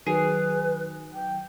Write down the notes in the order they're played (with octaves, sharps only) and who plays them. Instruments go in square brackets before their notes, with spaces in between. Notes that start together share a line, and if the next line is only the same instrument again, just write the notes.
[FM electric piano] D#3 F#3 [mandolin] G#4 [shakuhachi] B4
[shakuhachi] G5